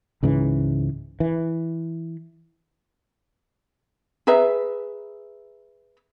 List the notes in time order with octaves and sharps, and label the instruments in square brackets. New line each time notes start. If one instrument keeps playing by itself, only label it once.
[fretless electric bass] C#2 G#2 C#3 E3
E3
[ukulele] G#4 B4 E5 A#5